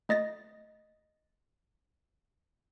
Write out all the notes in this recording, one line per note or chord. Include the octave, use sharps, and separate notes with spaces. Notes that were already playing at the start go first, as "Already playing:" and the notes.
A3 D#5 A6 A#6